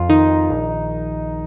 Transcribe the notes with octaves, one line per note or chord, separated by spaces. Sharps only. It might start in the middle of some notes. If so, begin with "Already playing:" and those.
Already playing: F2 F4
D#3 D#4
A#1